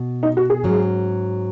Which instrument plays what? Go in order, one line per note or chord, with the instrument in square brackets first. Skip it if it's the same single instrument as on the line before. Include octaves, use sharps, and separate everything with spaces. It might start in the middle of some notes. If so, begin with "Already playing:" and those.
Already playing: [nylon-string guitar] B2
[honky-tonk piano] D#4
F#4
G#4
[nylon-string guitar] G#2 F#3 C#4